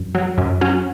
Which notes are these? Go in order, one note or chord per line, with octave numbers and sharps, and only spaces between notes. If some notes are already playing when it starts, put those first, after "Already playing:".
Already playing: F#2
F#3
F#2
F#3 C#4